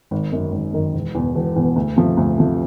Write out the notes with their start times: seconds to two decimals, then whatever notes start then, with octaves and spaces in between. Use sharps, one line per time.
0.11 G#1
0.32 F#2 D#3
0.52 G#1
0.73 F#2 D#3
0.94 E1
1.15 E2 B2
1.35 E1
1.56 E2 B2
1.76 D2
1.96 C3 F3 A3
2.17 D2
2.38 C3 F3 A3